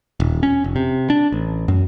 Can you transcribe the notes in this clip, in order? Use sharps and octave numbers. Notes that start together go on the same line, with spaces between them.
D#1
C#4
F1
C3
D4
A1
F#2